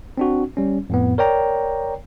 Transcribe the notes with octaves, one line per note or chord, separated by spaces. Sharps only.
C4 D4 F#4
G3 C#4
F2 A2 B3
A#4 C#5 D5 G5 A#5